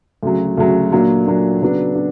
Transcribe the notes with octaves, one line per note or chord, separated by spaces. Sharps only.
D2 C#3 F#3
D2 C#3 F#3
A#2 F#3 A#3 D4
A#2 F#3 A#3 D4
C#3 F#3 B3 D4
D4